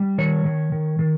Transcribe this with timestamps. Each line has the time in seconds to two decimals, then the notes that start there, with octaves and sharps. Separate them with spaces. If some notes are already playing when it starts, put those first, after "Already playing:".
Already playing: G3
0.18 D#3 C#5
0.45 D#3
0.72 D#3
0.99 D#3